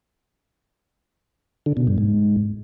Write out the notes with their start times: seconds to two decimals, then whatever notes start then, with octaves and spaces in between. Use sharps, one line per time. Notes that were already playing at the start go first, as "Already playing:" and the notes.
1.66 D3
1.77 B2
1.87 G2
1.98 G#2